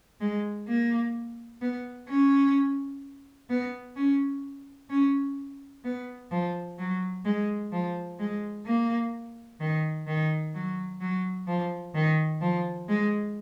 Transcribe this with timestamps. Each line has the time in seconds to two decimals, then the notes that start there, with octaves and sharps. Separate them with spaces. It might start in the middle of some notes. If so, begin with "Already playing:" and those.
0.21 G#3
0.68 A#3
1.61 B3
2.08 C#4
3.50 B3
3.96 C#4
4.90 C#4
5.84 B3
6.31 F3
6.79 F#3
7.25 G#3
7.72 F3
8.19 G#3
8.65 A#3
9.60 D#3
10.07 D#3
10.54 F#3
11.01 F#3
11.47 F3
11.95 D#3
12.41 F3
12.88 G#3